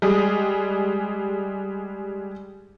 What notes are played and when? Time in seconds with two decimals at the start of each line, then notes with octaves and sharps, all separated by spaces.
0.02 G3 G#3 G#4